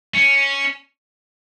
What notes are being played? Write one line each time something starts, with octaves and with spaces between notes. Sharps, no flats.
C#4